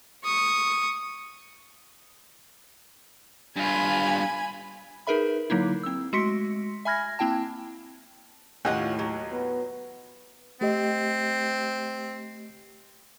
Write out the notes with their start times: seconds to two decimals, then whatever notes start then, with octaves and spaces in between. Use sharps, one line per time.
0.24 C#6 D#6
3.57 G2 F4 G#5 B5
5.07 D#4 G#4 A#4 B4 E5 B5
5.50 D3 F#3 A#3 D#4 E4
5.83 C4 E6
6.13 G#3 A3 F#4 C6 B6 C#7
6.85 E5 G#5 B5 F6 G#6 A#6
7.19 A#3 C4 E4 G5 A5
8.65 D#2 A2 C#4 F4 D#5 F#5
8.99 F#3
9.32 B3
10.61 A3 C4 G4 D#5